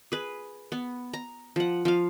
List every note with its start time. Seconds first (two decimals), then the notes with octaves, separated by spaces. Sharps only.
0.12 G#4 B4
0.72 B3
1.13 A#5
1.56 F3 F#5
1.85 F3 F5